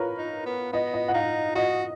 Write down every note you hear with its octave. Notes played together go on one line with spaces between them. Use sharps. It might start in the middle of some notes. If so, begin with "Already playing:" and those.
Already playing: F4 A#4 B4 C#5
D#4
B3
B3 D#5
D#5
F#5
D#4 F5
F#4 D#5